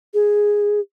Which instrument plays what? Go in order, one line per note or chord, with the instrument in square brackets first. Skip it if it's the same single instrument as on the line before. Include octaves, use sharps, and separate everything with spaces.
[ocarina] G#4